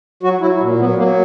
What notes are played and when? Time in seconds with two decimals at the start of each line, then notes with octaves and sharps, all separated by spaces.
0.23 F#3 F#4
0.41 F#3 E4
0.61 A#2
0.78 F#3 B3
0.98 F#3 A#3